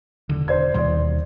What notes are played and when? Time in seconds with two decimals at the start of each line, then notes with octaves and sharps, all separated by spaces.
0.29 E1 D3
0.48 C5 D5 G#6
0.74 D#2 B2 G3 D5 C6